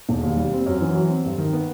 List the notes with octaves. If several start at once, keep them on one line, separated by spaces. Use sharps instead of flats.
E1
D#2
G3
C4
F#2
E3
F#3
C4
G2
D#3
B3